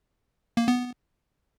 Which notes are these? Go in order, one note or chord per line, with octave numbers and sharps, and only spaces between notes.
A#3
B3